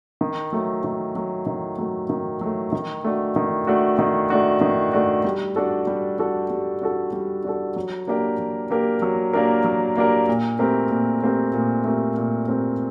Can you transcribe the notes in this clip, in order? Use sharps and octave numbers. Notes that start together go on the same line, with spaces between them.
D#3
F#3 A3
D#3
F#3 A3
D#3
F#3 A3
D#3
F#3 A3
D#3
A3 D4 F#4
D#3
A3 D4 F#4
D#3
A3 D4 F#4
D#3
A3 D4 F#4
G3
D4 F#4 A4
G3
D4 F#4 A4
G3
D4 F#4 A4
G3
D4 F#4 A4
F#3
A#3 D4 G4 A#4
F#3
A#3 D4 G4 A#4
F#3
A#3 D4 G4 A#4
F#3
A#3 D4 G4 A#4
A#2
A3 C4 G4 A#4
A#2
A3 C4 G4 A#4
A#2
A3 C4 G4 A#4
A#2
A3 C4 G4 A#4